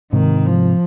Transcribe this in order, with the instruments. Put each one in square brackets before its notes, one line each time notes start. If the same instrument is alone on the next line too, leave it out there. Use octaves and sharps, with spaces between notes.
[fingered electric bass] G#2 C3 [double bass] D#3
[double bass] F3